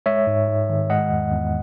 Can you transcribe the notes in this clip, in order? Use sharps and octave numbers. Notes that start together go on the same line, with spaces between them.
G#3 C#5 E5
G#2
G#2
D#3
G#3 D#5 F#5
E2
E2